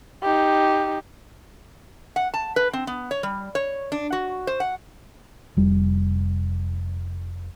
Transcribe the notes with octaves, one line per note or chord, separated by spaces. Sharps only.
D#4 G4
F#5
A5
B4
C4
B3
C#5
G3
C#5
D4
F#4
C5
F#5
F1 G3